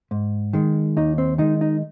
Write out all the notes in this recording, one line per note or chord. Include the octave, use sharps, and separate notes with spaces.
G#2
D#3 G#3
D#2 D#4
C4
D#3 G#3 D#4
D#4